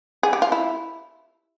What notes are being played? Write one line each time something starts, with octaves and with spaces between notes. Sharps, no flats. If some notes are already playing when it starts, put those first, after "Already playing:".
G#4
G4
F4
E4